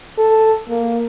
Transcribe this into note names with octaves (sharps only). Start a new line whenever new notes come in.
A4
A#3